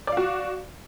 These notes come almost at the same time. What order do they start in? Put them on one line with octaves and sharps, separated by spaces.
D5 F5 F#4